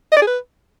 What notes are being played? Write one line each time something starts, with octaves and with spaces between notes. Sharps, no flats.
D#5
D5
G#4
B4